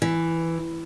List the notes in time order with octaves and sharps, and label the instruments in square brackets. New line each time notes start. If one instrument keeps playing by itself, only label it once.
[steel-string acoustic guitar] E3